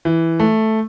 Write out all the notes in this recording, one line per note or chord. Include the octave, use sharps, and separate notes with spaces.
E3
A3